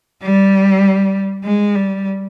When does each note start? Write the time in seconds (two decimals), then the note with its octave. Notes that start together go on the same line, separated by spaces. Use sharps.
0.23 G3
1.44 G#3
1.75 G3